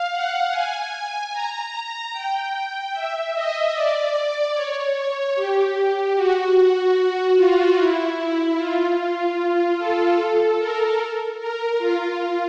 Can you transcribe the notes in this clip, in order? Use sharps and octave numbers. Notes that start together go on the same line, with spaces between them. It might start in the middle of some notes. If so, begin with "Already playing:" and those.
Already playing: F5
F#5
G#5
G#5
A#5
G5
E5
D#5
D5
C#5
G4
G4
F#4
F4
E4
F4
A4
A4
A#4
A#4
F4